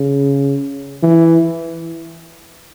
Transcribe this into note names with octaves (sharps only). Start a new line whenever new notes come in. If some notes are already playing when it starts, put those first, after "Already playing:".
Already playing: C#3
E3